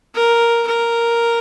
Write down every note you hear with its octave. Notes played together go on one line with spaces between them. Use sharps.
A#4
A#4